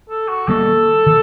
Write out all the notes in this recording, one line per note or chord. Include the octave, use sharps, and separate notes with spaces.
A4
F#4
D#3 G3 A#3 A4
D#3